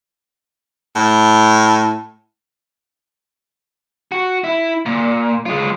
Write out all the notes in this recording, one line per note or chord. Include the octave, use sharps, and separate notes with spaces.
A2
F#4
E4
A#2
G#3 F4